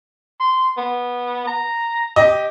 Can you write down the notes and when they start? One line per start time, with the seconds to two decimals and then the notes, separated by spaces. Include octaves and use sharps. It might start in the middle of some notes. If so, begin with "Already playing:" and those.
0.40 C6
0.77 B3
1.47 A#5
2.16 G4 D#5